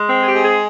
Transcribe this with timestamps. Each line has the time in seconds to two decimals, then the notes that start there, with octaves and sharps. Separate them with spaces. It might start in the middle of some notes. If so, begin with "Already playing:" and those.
Already playing: G#3
0.09 C4
0.19 G#4
0.26 G4
0.35 G#3
0.44 G#4